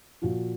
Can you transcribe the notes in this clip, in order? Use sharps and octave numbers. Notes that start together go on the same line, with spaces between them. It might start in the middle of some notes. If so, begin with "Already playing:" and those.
A#2 F3 F#4